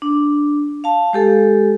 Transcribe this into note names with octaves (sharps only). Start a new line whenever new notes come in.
D4
F5 A5
G#3 G4 A4